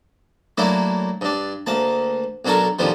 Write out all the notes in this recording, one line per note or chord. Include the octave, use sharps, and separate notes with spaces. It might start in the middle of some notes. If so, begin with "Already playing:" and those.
F#3 A3 A#3 D4 E4
G2 D4
D2 A#3 A5
B1 F#3 D4 A4 A#4 C#6
A#1 F2 D3 D#3 F3 G3